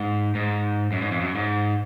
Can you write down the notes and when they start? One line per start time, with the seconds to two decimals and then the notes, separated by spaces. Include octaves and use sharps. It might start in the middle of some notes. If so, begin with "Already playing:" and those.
Already playing: G#2
0.35 G#2
0.92 F#2
1.01 G#2
1.11 F2
1.21 F#2
1.35 G#2